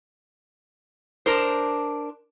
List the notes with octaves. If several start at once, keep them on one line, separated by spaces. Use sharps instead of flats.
D4 A#4 C5